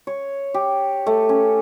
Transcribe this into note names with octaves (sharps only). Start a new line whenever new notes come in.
C#5
G4
A3
C#4